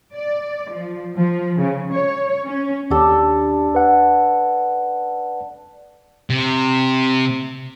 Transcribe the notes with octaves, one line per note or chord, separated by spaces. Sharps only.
D5
F3
F3
C#3
C#5
C#4
D#2 D4 G4 A4
B4 F#5
C3